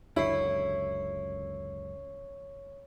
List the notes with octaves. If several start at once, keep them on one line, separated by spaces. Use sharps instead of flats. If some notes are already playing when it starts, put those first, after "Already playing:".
C#2 F#2 D3 E4 C#5 C#6 C7